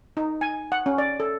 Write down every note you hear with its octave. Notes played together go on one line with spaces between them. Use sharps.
D#4
G#5
F#5
C#4
D5
A4